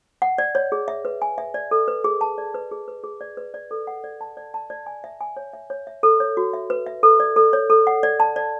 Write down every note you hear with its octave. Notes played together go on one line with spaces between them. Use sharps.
F#5
D5
C#5
G#4
E5
B4
G#5
E5
D5
A4
B4
G#4
A5
D5
B4
G#4
B4
G#4
D5
B4
D5
A4
F#5
D5
A5
D5
A5
D5
G#5
E5
G#5
C#5
E5
C#5
E5
A4
C#5
F#4
E5
B4
E5
A4
D5
A4
C#5
A4
F#5
D5
A5
D5